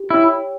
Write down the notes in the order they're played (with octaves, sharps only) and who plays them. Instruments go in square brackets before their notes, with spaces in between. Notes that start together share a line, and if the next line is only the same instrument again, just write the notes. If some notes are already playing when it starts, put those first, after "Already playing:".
Already playing: [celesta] G4
[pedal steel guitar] E4 [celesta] C#5 G5